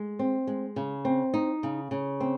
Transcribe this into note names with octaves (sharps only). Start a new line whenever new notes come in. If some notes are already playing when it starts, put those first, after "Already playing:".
Already playing: G#3
C4
G#3
C#3
C4
D#4
C#3
C#3
C4